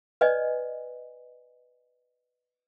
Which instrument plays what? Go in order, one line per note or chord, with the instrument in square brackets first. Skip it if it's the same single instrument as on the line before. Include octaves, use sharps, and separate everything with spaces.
[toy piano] B4 D5 D#5 G#5